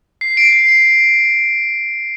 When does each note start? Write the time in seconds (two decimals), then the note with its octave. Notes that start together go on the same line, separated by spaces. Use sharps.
0.21 C7
0.37 D7
0.53 C7
0.68 D7